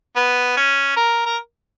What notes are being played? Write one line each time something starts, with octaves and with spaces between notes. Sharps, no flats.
B3
C#4
A#4
A#4